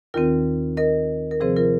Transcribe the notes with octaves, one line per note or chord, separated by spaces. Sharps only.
D#2 D#3 C4 F4 A#4
A#4 D#5
A#4
C3 F3 C4 G#4 C5
F4 A#4